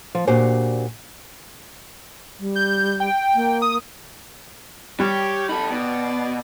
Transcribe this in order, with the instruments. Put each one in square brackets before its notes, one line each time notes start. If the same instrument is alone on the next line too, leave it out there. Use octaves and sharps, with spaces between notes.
[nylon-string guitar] F3
A#2 D4 F#4 G4 C5 G#5
[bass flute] G3
[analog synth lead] G6
G5
[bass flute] A#3
[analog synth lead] D#6
[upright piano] G3 [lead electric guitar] G4 [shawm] C#5
[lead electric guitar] D#4 A4 [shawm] B5
[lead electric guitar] B2 [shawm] D5